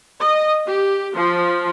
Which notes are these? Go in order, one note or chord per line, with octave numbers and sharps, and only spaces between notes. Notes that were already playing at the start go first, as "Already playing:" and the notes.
D#5
G4
F3